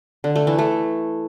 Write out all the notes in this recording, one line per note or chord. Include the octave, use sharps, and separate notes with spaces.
D3
A3
E3
A3